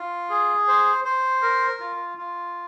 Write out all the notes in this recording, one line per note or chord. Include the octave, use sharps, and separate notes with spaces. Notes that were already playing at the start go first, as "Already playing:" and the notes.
Already playing: F4
G#4
C5
C5
A#4
F4
F4